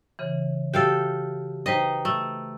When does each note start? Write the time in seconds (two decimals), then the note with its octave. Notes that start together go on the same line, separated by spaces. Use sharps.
0.19 C#3 E3
0.74 F#4 G4 A4 E5 F5 G5
1.66 D#4 B4 C5 D#5 G5
2.05 A3